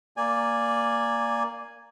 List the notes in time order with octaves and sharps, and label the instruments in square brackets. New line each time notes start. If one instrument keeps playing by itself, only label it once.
[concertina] A#3 D5 G#5